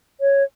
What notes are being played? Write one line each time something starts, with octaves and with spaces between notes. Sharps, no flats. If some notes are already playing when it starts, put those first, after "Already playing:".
C#5